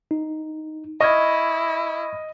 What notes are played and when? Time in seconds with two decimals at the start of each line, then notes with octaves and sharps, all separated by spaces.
0.11 D#4
1.01 E4 D#5 C#6 F6 G#6